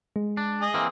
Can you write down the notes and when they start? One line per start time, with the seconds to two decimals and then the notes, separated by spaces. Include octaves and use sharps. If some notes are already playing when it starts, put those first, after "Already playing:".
0.16 G#3
0.37 D4
0.61 G#4 D#5
0.74 E3 A#3 C4